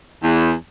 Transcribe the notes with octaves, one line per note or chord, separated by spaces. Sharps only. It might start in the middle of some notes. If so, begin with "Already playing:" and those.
E2